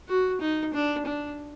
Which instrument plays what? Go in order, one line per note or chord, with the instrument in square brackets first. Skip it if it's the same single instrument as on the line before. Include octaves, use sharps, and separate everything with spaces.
[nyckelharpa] F#4
D#4
D4
D4